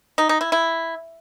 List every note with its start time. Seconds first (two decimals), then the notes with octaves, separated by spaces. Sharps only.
0.18 D#4
0.29 D#4
0.41 E4
0.52 E4